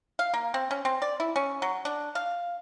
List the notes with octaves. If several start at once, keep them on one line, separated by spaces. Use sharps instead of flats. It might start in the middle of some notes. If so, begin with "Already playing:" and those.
F5
A#3
C4
C#4
C4
D5
E4
C#4
F#3
D4
F5